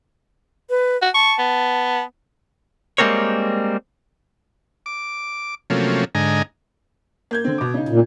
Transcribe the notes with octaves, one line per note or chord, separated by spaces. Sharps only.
B4
F#4
A5 C#6
B3
G3 G#3 A#3 C4 A#4 C#5
D6
C3 F3 F#3 A3 A#3 C#4
G#2 D3 D#5 G#5 A#5
A#3 G6 G#6
D3 C4
B2 D6
C#3 D#4
A#2